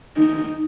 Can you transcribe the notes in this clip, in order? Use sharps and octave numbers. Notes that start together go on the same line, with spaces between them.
D#4